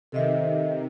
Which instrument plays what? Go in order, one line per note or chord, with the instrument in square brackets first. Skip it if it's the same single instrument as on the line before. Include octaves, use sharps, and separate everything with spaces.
[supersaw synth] C3 D#3 [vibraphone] A4 D#5 E5